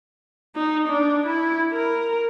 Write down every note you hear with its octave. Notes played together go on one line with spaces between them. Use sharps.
D#4
D4
E4
A#4